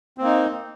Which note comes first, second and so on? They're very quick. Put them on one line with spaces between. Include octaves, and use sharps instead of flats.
C4 A#3 D#4